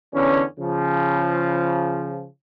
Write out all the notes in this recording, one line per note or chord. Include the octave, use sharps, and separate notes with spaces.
E2 D3 C#4
C#3 F3